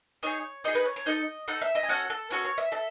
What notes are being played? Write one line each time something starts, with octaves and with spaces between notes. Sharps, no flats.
D#4 G#4 C#5
D#4 G#4 D#5
B4
C#5
C#5
D#4 A4 D#5
D#4 A4 F#5
E5
D#5
G#5
C#4 F#4 A4 F#5
A4
C#4 F#4 A4 B4
C#5
E5
A4 E5